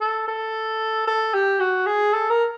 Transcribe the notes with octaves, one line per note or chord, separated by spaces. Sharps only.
A4
A4
A4
G4
F#4
G#4
A4
A#4